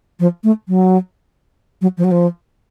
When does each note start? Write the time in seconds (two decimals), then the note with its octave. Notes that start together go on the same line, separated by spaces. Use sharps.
0.20 F3
0.44 A3
0.68 F#3
1.82 F#3
1.98 F3
2.04 F#3
2.11 F3